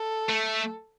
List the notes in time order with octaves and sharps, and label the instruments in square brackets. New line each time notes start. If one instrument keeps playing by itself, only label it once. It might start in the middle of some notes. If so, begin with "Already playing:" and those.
Already playing: [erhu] A4
[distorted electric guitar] A3